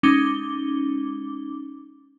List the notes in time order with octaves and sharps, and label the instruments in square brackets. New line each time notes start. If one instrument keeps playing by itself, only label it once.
[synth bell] G#3 C#4 D#4 D6 G7